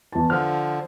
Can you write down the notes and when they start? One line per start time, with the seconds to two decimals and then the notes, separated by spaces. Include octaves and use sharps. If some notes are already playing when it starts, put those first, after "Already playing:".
0.12 E2 A5
0.30 D3 F3 F6